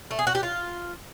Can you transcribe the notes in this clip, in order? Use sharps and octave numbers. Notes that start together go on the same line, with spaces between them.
A3
G#4
F#4
G4
F4